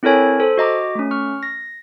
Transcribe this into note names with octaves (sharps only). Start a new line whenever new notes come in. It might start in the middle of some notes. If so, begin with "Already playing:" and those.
C4 E4 A4 A#4 C#5 G#5
A4 C5
F#4 D#5 A#5 D6
A3 C#4
C#6 F6
A#6